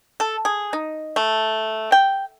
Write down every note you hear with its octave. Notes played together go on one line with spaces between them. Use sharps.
A4
G#4
D#4
A3
G5